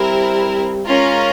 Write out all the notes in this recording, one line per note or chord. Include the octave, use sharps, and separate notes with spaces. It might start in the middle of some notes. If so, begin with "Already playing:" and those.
Already playing: G3 C4 E4 A#4
G#3 C#4 F4 A#4